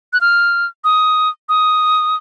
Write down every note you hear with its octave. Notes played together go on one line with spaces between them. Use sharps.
F#6
F6
D#6
D#6